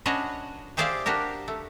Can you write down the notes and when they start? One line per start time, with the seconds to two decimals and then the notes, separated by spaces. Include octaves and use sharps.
0.06 C#4 D4 F#4 B4 C#5 D#5
0.77 G4 G#4 C5 D5 E5 F5
1.06 D4 F#4 G4 A#4
1.48 A3